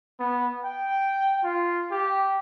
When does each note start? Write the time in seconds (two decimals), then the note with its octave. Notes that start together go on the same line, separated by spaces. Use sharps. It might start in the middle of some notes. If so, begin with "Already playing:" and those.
0.20 B3
0.64 G5
1.44 F4
1.91 G4